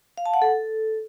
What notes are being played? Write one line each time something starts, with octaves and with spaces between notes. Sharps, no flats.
F5
A5
F#5
A4